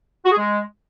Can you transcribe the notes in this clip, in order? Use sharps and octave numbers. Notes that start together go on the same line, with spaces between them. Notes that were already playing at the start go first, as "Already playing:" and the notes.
F#4
G#4
G#3